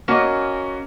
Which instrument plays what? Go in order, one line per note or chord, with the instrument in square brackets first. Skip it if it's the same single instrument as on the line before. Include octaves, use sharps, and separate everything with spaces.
[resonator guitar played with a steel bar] A#3 D#5 [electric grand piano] C#4 F#4 C#6